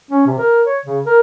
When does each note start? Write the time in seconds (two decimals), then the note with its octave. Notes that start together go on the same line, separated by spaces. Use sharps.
0.11 C#4
0.26 C3
0.39 A#4
0.66 C#5
0.86 C#3
1.06 A#4